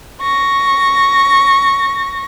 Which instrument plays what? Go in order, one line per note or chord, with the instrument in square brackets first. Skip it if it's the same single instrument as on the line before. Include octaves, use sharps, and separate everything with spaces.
[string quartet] C#6 A#6